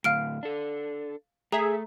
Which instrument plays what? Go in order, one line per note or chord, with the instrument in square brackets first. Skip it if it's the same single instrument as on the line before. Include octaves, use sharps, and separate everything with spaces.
[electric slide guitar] A2 D3 [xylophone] F5 F6 D7
[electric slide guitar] D4 A4
[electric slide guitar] A3 [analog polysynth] G#4 E5 [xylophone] A#5